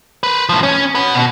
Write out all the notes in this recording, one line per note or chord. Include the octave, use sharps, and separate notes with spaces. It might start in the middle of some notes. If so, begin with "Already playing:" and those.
A#4 B4
A2 F3
C#4
F#4 B4
B2